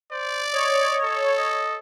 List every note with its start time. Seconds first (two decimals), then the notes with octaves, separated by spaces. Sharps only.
0.12 C5 D5
0.53 C#5 D#5
1.03 A4
1.38 D#5